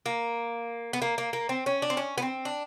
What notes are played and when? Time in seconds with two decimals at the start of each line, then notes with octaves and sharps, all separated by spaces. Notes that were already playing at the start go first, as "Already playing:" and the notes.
0.06 A#3
0.93 B3
1.02 A#3
1.18 A#3
1.33 A#3
1.49 C4
1.66 C#4
1.82 D4
1.90 C4
1.97 C#4
2.18 B3
2.22 C4
2.45 D4